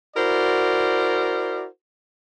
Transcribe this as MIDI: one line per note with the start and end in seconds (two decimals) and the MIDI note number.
0.16 1.66 64
0.16 1.66 66
0.16 1.66 70
0.16 1.66 72
0.16 1.66 74